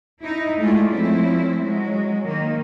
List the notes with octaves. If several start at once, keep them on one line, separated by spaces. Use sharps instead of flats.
D#4 E4
G#3 A3 E4 F4 G#4 D5
F3 A3 C4 C#4 E4
F#3 G#3
D#3 A#3